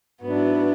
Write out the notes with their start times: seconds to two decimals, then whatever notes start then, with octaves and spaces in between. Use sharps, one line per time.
0.23 G#2 F#3 B3 D4 E4